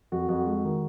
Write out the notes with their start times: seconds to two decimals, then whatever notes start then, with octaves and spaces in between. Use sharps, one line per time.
0.12 F2 F#4
0.29 F2 F#4
0.47 G#3 F#4
0.65 D#3